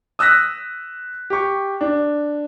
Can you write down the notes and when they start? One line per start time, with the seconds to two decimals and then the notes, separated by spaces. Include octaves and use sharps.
0.19 D#6 E6 F#6 A#6 B6
1.30 G4 C#6
1.81 D4